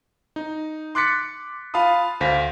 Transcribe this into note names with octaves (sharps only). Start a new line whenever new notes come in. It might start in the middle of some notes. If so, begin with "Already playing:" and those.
D#4
C6 D6 F#6 A6 B6 C#7
F4 F5 A5 B5 D#6
D2 C5 F5 A#6 B6